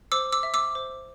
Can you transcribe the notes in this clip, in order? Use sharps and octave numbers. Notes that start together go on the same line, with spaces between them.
C5 D6 E6
D6 E6
E5
D6 E6
C5